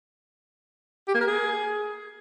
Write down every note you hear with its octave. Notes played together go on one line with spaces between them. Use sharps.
G4
A#3
A#4
G#4